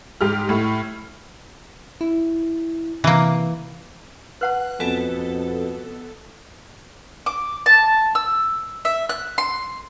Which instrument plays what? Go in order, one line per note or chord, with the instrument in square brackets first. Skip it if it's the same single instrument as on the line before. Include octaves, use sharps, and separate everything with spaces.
[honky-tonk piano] G#2 G4 F6
A2
[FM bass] E4
[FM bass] C3 [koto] E3 A#3
[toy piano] B4 F#5 A5 [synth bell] F#6
[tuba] F2 [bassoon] B2 [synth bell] B3 A4 [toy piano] G#5
[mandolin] D6
A5
E6
E5
F#6
C6